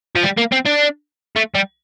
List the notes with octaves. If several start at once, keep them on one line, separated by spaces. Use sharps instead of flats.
F3
G3
A#3
C4
D4
A3
G3